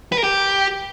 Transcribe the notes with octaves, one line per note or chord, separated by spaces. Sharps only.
B4
A#4
G4